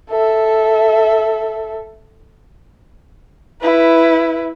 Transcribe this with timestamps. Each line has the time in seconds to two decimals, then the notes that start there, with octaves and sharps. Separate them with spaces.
0.11 A4 E5
3.61 E4 B4